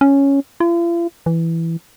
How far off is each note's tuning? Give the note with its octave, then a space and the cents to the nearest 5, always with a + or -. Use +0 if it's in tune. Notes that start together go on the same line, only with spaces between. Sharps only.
C#4 +0
F4 -45
E3 +5